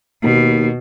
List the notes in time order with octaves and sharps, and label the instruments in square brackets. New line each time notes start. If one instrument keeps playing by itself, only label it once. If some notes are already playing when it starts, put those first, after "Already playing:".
[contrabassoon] D#2 [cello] B2